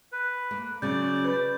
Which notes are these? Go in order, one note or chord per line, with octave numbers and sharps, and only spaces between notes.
B4
A#3
C#3 F#3 C#4 D5 G6
B4 G6